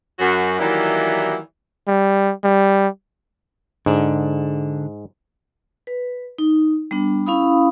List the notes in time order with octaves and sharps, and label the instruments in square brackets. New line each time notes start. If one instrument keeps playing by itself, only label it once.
[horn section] F#2 F#4
D#3 E3 F#3 G3 A#3 E4
[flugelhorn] G3
G3
[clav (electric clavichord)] G#2 [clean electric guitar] D3 D4
[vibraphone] B4
D#4
G3 B3 D4
C#4 E4 F5 B5 D#6